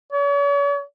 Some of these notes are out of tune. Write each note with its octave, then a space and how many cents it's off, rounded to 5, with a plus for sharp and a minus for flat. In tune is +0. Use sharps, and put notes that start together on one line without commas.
C#5 +45